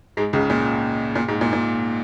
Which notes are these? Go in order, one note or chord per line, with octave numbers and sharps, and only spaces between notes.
G#2 G#3
C#2 C#3
A#2
A#2
G#2
A#2
A#2